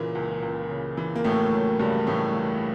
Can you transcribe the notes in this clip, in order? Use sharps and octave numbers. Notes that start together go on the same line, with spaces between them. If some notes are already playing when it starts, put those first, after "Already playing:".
Already playing: A#2 C#3 E3 A#3
C#2
C#2
C#3
E3
A#3
C#2 A2 A3
C#2 F#3
G2 C#3 G3
A2 E3 A3
C#2